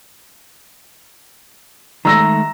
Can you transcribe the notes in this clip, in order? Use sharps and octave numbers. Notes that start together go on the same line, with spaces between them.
D#3 G#3 A3 A#5 E6 A#6